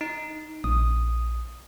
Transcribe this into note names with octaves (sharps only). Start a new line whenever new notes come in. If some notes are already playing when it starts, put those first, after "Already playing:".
D#4
A#1 D#6